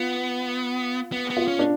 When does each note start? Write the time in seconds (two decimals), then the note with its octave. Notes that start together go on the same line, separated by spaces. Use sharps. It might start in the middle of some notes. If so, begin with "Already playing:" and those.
Already playing: B3 F4
1.12 B3
1.30 B3
1.37 F4
1.48 C#4
1.59 D4